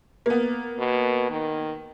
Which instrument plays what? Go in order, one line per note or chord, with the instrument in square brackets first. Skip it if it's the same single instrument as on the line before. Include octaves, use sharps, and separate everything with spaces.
[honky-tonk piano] A#3 B3
[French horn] B2
D#3